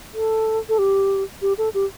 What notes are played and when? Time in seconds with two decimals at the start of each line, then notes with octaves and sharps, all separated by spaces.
0.14 A4
0.69 A4
0.79 G4
1.42 G4
1.58 A4
1.74 G4